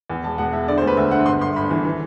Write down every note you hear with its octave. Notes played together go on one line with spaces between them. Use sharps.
E2
E1 A5
E1 F#5
E1 E5
D3 D5
C5
D2
B4
D2 E5
D3 F#5
G1 C6
G1 C6
G1 B5
E3
E3